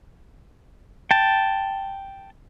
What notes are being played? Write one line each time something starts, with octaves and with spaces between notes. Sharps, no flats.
G5 A5